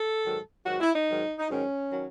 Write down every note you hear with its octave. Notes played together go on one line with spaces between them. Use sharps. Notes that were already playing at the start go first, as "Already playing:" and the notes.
Already playing: A4
G#2 D#3 F#3
G#2 D#3 F#3 F#4
E4
D#4
G#2 D#3 F#3
D#4
G#2 D#3 F#3 C#4
D#3 F#3